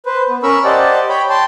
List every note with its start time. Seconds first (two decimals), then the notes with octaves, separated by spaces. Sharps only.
0.06 B4 C5
0.29 B3
0.43 C#4 A#4 B5 C#6 E6
0.64 G4 C5 D5 D#5 F#5 A5
1.09 C#5 G5 B5
1.30 G5 A5 C6